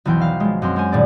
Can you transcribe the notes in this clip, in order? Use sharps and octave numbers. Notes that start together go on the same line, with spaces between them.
B1 E2 E3 F3 G5 C6
E5 F5
F3 G#3
F#2 C4 C6
C#4 C5 G#5
D#1 A#2 G#4 D5